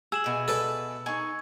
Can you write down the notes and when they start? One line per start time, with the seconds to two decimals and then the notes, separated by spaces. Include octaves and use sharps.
0.12 G#4 E6 E7 F#7
0.24 D2 B2 G#5
0.48 A4 B4 D5
1.06 G#3 D#4 G#5 C#6